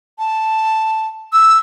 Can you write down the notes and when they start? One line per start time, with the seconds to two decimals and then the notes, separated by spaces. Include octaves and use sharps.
0.19 A5
1.33 E6